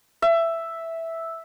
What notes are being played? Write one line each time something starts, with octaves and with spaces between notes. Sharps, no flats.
E5